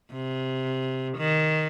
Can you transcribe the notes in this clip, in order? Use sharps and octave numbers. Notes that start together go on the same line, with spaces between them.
C3
D#3